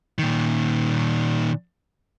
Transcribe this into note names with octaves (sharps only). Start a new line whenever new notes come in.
A#2 D#3